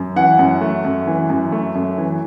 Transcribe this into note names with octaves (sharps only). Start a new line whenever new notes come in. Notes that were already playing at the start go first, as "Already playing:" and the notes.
Already playing: F#2
E3 F#5
F#2
A3
F#2
E3
F#2
A3
F#2
E3